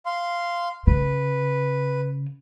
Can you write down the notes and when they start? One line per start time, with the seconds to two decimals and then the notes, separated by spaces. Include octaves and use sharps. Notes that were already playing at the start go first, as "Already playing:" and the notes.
0.06 F5 C6
0.87 C#3 B4